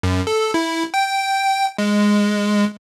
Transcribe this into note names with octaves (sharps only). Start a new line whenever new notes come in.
F#2
A4
E4
G5
G#3